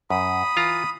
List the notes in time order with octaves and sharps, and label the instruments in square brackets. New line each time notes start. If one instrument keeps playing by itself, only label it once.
[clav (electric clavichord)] F#2 [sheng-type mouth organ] B5 D#6
[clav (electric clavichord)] E3 F4 A#5